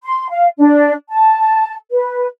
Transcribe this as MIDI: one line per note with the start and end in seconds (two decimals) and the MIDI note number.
0.04 0.30 84
0.30 0.48 77
0.58 0.93 62
1.11 1.75 81
1.91 2.27 71